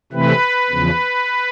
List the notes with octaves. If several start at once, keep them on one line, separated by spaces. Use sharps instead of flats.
C3 E3 A3 C4 B4
E2 C#3 F3